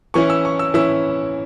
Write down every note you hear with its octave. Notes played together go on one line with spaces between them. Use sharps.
E3 C#4 E4 C#6
E6
C#6
E6
E3 C#4 E4 E6